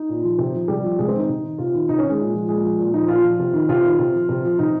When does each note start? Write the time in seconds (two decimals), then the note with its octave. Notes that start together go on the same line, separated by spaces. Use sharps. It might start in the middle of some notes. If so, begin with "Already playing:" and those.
Already playing: D#4
0.09 A#2
0.24 F3
0.38 C3
0.54 F3
0.68 C3 G3
0.83 F3
0.98 C3 G#3
1.08 C4
1.14 D#3 D#4
1.29 C3
1.43 D#3
1.58 C3 F4
1.74 D#3
1.89 C3 D#4
1.98 C#4
2.04 D#3
2.09 G#3
2.19 A#2
2.34 F3
2.49 A#2 G#3
2.64 F3
2.79 A#2
2.94 F3 D#4
3.08 A#2 F4
3.24 F3
3.39 C3
3.54 D#3
3.69 C3 F4
3.84 D#3
3.99 C3
4.14 F3
4.29 C3
4.44 F3
4.59 C3 D#4